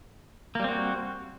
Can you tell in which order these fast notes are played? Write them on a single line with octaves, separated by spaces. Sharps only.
A#3 G3 C4 F#4